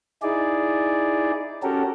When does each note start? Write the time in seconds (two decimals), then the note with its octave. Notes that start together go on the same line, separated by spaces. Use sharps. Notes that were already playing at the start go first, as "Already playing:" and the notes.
0.22 D#4 E4 G#4 D5
1.63 C#4 F#4 G4 A4 A#4